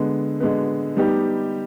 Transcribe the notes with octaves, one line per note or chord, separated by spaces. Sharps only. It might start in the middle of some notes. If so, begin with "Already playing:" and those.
Already playing: D3 G#3 B3
D3 G#3 B3
G3 B3 D#4 G4